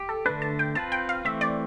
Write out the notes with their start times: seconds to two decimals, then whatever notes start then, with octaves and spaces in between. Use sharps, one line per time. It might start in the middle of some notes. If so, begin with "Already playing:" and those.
Already playing: G4
0.09 A4
0.26 D3 A3 D4 B4
0.42 A5
0.59 G5
0.75 C4 F4 B4 A5
0.92 G5
1.09 F5
1.25 E3 A3 C4 E5
1.41 D5